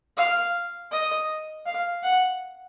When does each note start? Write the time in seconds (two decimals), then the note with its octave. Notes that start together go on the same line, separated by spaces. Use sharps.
0.17 F5
0.91 D#5
1.66 F5
2.03 F#5